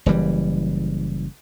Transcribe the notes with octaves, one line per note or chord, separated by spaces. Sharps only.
F#1 E3 G3